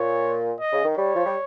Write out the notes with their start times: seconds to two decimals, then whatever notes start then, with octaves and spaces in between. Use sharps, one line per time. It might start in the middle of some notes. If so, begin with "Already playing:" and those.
Already playing: A#2 C#5
0.60 D#5
0.73 C#3
0.84 D#3
0.97 G3 C#5
1.16 F3
1.26 G3